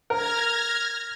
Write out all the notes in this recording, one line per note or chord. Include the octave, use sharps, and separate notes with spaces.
A#4 F6 G#6 A#6